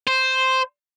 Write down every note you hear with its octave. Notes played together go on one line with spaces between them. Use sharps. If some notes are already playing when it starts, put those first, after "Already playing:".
C5